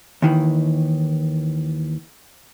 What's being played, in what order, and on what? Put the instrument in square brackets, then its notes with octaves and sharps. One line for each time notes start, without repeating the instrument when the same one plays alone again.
[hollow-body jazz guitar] D#2 D#3 E3